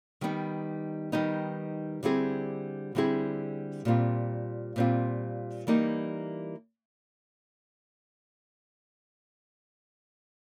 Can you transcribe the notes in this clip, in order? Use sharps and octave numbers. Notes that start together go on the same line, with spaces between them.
D#3 G3 B3 D#4
D#3 G3 B3 D#4
D3 G3 C4 E4 G#4
D3 G3 C4 E4 G#4
A#2 G3 C4 F4
A#2 G3 C4 F4
E3 G3 A#3 D#4